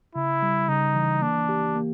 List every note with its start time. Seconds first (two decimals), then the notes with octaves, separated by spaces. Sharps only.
0.15 C#3 E4
0.42 G3
0.68 C#3 D#4
0.95 E3
1.22 A#3 D4
1.49 G4
1.75 A#3